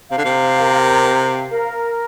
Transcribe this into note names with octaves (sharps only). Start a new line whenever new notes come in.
C3 F5
D3
C3
A#4
F5
A#4